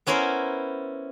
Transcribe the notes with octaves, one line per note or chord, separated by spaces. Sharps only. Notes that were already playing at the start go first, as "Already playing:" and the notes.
B3 C#4 E4 A#4 C5